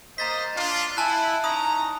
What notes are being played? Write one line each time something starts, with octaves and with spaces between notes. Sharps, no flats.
A#3 C5 D#5 A#5 A6 B6
D4 F4
E4 G#5 A5 F#6
C#4 D#4 A#5 D#6